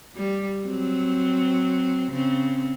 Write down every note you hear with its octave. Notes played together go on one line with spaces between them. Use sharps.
G3
F#3 C4
C#3 C4